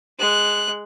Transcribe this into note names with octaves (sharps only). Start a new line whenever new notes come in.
G#3 F#6